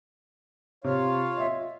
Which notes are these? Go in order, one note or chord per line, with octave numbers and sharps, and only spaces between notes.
C3 F4 C#5 F5
D#5 E5